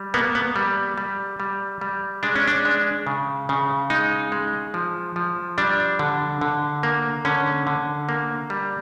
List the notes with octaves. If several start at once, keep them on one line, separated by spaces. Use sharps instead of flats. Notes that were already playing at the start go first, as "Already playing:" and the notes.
Already playing: G3
A#3 B3
B3
G3
G3
G3
G3
G#3 D4
C#4
D4
G#3
C#3
C#3
G#3 D#4
G#3
F3
F3
G3 D4
D3
D3
A#3
D3 C#4
D3
A#3
G3